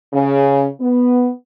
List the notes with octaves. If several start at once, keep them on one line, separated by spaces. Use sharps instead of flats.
C#3
B3